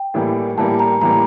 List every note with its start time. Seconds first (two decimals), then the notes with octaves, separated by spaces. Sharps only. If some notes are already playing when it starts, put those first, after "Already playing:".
Already playing: G5
0.14 A2 E3 G3 A#3
0.57 A2 E3 G3 A#3 A5
0.79 A#5
1.01 A2 E3 G3 A#3 A#5